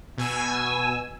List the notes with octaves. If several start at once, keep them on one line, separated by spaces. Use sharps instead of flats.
B2 G#5 E6